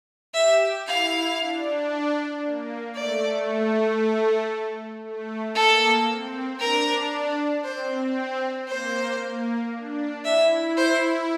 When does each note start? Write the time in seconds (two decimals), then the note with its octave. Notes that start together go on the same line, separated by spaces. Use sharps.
0.34 G4 E5
0.86 E4 F5
1.38 D4
2.43 A#3
2.95 A3 D5
5.04 A3
5.55 A#3 A4
6.08 C4
6.60 D4 A#4
7.64 C4 C5
8.68 A#3 C5
9.21 A#3
9.73 D4
10.25 E4 E5
10.77 C5